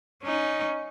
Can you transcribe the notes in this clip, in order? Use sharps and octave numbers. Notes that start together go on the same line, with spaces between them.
C#4 D#4